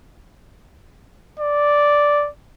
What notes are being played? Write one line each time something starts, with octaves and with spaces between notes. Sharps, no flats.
D5